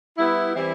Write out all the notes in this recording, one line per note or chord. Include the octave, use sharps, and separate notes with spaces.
G3 B3 E4
E3 G3 C4 E4